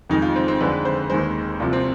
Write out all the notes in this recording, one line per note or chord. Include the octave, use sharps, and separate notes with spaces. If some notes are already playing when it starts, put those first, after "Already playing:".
F2 D#3 G#3 D#4
F4
C4
C4
F2 D3 G#3 B4
C5
D#2 D#3 G#3 C5
C2 C3 F3 F4
C4